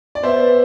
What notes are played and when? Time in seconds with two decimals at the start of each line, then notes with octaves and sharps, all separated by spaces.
0.15 D5
0.23 B3 C5 E5